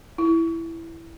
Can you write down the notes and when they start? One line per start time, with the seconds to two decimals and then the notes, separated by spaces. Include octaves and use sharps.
0.18 E4